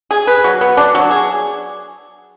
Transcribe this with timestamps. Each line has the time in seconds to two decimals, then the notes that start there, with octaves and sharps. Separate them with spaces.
0.11 G#4
0.27 B4
0.44 F#3
0.61 B3
0.77 D4
0.95 F#3
1.11 G#4